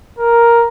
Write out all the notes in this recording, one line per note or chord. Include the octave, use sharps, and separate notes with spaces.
A#4